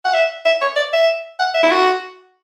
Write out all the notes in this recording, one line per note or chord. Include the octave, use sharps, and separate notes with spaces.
F#5
E5
E5
C#5
D5
E5
F#5
E5
E4
F#4